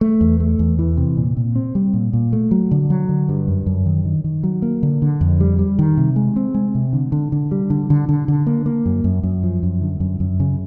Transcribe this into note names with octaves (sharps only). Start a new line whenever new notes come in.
A3
E2
A3
E2
E3
C3
A#2
A#2
C4
G3
A#2
A#2
A3
F#3
D3
F#3
D3
G2
F#2
F#2
D#3
D#3
D#3
F#3
A#3
D3
D3
F2
G3
G3
D#3
C3
G#3
C4
G#3
C3
D3
D3
D3
G3
D3
D3
D3
D3
A#3
A#3
F#2
F#2
F#2
F3
F#2
D3
F#2
F#2
C#3